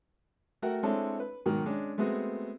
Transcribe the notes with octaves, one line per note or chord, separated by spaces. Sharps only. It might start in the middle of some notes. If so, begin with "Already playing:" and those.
A3 F#4 A#4 F#5 G5
G#3 C4 D4 E4 A4 C#5
B4
G#2 B2 D#3 F#3
G#3 C#4 D4
G#3 A3 B3 C4 F#4 G#4